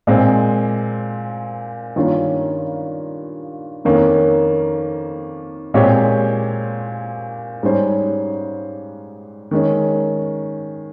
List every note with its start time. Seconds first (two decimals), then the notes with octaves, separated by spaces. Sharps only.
0.07 A#2 G#3 C4
1.96 G2 D#3 A#3 C#4 F4
3.85 F2 D#3 A#3 C#4
5.74 A#2 G#3 C4 G4 C#5
7.63 G#2 G3 C#4 G#4 C5
9.51 D#3 G#3 C#4